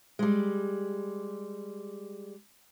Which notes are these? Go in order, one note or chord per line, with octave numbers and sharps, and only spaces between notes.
G3 G#3